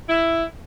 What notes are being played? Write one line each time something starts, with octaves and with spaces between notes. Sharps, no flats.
E4